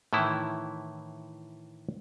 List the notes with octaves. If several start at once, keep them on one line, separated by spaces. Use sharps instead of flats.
A2 D#3 E3 E4